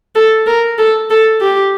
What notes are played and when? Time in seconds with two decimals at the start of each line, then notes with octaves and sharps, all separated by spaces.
0.16 A4
0.47 A#4
0.78 A4
1.10 A4
1.41 G4